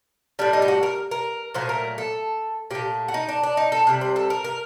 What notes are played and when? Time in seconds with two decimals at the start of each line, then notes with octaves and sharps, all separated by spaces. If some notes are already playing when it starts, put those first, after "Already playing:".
0.39 A2 G3 D4
0.53 D#4
0.62 G4
0.68 F#4
0.83 A#4
1.11 A#4
1.54 A#2 F#3 A3 C5
1.69 A#4
1.98 A4
2.70 A#2 A3 G4
3.08 F#4
3.14 D#4
3.28 D4
3.43 D4
3.57 D#4
3.72 A4
3.87 C3 G3
4.01 C5
4.16 A4
4.30 A#4
4.44 A#4